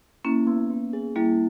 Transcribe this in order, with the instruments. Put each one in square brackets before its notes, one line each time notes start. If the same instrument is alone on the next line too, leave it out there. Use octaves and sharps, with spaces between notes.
[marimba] A#3 C#4 [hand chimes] E4
[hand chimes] B3
B3
G#4
[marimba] G3 A#3 [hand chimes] E4